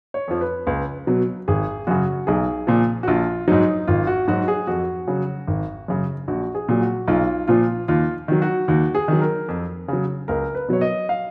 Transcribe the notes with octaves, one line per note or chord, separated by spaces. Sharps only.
C#5
F2 F3
B4
C#2
B2 F#3
G#1 G#4
F#2 C#3 F#4
B1 G#4
A#2 F3
F#4
A#1 F4
G#2 F#3 D#4
G#1 F4
F#4
G#2 F#3 F#4
G#4
F2 F#4
C#3 F#3
G#1
F#2 C#3
A#1 F#4
G#4
A#2 F#3
F#4
B1 F4
A#2 F3 F4
D#2 F4
D#3 F#3
F#4
D#2 F#4
G#4
D#3 F#3
A#4
F2
C#3 F#3
C#2 A#4
B4
B2 F#3 C#5
D#5
F5